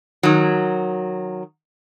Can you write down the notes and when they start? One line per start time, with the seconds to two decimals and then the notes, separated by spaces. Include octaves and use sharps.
0.23 D#3 F#3